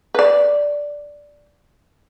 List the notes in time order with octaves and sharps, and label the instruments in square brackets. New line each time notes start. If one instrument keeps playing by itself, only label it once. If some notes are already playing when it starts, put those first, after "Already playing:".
[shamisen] B4 D5